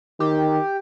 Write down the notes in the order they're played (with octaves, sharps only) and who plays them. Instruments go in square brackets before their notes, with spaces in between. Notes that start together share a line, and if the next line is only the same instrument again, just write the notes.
[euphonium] D#3 [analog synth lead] G4